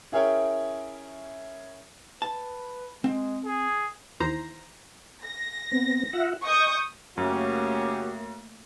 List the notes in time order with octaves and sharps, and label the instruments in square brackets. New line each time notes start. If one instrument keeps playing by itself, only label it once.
[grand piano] C#4 E4 G#4 A#4 C#5 G5
[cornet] B4 [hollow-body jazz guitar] A5
[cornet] G#3 [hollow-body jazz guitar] C4
[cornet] G#4
[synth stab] D#2 E3 C5 A#5
[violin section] A#6
[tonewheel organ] B3 C4
F4 E5 F#5
[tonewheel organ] D#5 [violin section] C#6 D#6 G6
[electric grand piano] F#2 [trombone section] C#3 F#4 G4 [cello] A3 A#3 [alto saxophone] C#4